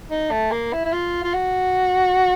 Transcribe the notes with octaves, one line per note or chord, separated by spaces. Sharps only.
D#4
A3
A#3
E4
E4
F4
F4
F#4